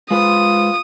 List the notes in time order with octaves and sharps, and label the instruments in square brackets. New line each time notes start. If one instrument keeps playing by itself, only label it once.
[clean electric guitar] G#3 B4 C5 [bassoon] F4 [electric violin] D#6